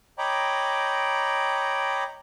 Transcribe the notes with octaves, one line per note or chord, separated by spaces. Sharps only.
C#5 D#5 G5 A#5 B5 D6